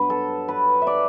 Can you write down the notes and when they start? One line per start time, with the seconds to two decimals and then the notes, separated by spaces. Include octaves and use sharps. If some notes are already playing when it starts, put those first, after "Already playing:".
Already playing: G2 F#3 B3 B4
0.10 A4
0.48 B4
0.82 E5
0.87 D5